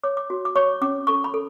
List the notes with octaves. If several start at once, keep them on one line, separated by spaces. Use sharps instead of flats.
C#5 D6
D6
F#4
D6
C#5 C#6
C#4 D6
A4 C#6
B5
A4